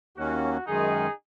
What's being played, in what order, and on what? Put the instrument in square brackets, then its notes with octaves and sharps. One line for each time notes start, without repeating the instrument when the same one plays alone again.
[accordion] D#2 D#3 A#3 C#4 [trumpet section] F#4
[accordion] F#2 D#3 G#3 [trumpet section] D#4 G#4